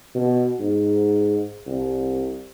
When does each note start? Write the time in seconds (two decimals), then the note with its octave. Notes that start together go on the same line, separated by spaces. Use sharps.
0.14 B2
0.59 G#2
1.66 C2